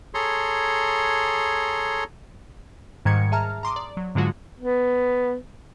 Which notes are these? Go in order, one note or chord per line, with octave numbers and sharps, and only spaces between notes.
G#4 A4 C#5 A#5 C6
G#2 D#3 G3 G#6 C#7
G#4 E5 A5 A#5 F6
A#5 C6 D6 D#6
D5
F#3
G#2 D3 F#3 G#3 F4 F#4
B3